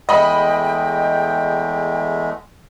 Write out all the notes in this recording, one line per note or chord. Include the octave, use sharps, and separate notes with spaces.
E2 G#3 A3 D#5 G5 B5